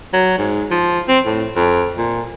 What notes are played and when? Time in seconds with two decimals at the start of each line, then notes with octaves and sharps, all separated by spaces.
0.13 F#3
0.38 G#2
0.71 F3
1.08 C4
1.26 A2
1.56 F2
1.98 A#2